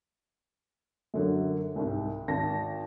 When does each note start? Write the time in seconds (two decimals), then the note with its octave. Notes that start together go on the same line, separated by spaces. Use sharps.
1.14 F#2 D3 F#3
1.76 C2 G#2
2.28 G#1 A5 A#6